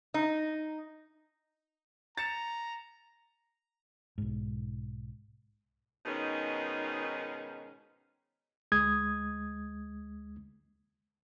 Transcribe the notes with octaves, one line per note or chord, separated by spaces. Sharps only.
D#4
A#5 A6 C#7 E7
B1 G#2
G#2 B2 D#3 C#4 D#4
D2 G#3 D#6 G#6